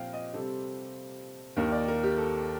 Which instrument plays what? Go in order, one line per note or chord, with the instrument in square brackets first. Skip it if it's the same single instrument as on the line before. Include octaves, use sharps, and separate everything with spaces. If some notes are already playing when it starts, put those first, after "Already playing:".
Already playing: [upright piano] A#2 F3 C4 F5 G5
D#5
C3 G3 C4 A4
D#2 D#3 A#3 A#4
D5
A#4
G4
A4